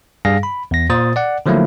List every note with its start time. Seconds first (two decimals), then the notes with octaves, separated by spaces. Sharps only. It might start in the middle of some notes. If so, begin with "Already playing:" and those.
0.25 G2 G3 G#4 F5 A#6
0.43 B5
0.71 E2 A#6
0.90 A#2 C5 D#6 A6
1.16 D5 F#5
1.46 D3 F3 F#3 A3 A#3 E4